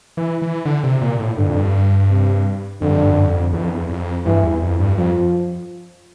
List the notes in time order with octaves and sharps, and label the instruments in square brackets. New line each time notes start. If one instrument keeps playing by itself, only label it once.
[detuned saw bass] E3
E3
D3
C3
A#2
A2
[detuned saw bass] G2 [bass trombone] D3
[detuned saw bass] F2
G2
[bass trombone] C3
[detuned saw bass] F2 [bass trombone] D3
[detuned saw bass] G2
F2
G2
F2
G2
F2
E2
F2
E2
F2
[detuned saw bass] G2 [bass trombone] E3
[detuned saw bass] E2
F2
G2
[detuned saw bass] F2 [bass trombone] F3